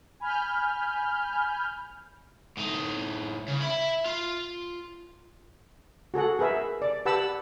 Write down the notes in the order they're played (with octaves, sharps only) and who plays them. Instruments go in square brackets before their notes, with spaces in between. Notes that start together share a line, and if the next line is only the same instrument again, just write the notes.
[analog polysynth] G#5 B5 F6 G6
[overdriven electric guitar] A2 D#4
C#3
E5 B5
F4
[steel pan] F#4 G#4 A4 F#5
G#4 A#4 B4 E5
D5
G4 B4 F#5 A5 B5 E6